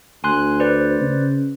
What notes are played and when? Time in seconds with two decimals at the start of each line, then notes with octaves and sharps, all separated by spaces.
0.24 D2 G#5 C6 F#6
0.60 B4 C5 D5
1.01 C#3